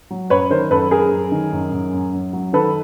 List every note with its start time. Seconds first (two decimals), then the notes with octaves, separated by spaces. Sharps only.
0.11 F#3
0.30 F#2 B4 C#5
0.50 D#3 A#4 C5
0.70 F#2 A4 B4
0.91 F#2 G#4 A#4
1.11 F#2
1.32 D#3
1.52 F#2
1.72 F#2
1.93 F#2
2.13 F#2
2.33 F#3
2.53 D#3 A4 B4